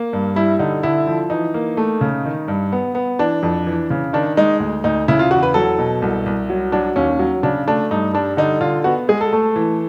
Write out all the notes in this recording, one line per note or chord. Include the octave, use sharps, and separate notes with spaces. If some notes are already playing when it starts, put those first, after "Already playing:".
Already playing: A#3
G2
G3 E4
D3 D#4
D3 E4
F3
E3 D#4
A#3
A3
C#3
D#3
G2
B3
B3
E3 D4
F2
E3
C#3
D#3 D4
G#3 D#4
D2
D2 D#4
C#3 E4
F4
E2 F#4
B4
F#3 A4
B2
C2
C2
F#3
F#3 D4
D#2 C#4
F#3
C#3 D4
A3 D4
G2 D#4
G3 D4
D3 D#4
D3 F4
B3 F#4
G#3 G#4
A4
A3
E3